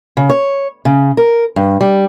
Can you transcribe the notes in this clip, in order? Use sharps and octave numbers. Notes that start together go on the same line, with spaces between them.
C#3
C#5
C#3
A#4
G2
G3